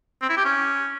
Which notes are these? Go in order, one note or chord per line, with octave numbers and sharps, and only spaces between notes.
C4
E4
G4
C#4